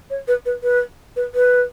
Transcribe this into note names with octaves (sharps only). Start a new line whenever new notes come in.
C#5
B4
B4
B4
B4
B4